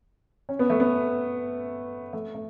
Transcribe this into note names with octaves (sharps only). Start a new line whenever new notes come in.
C#4
B3
A3
B3
A3
A3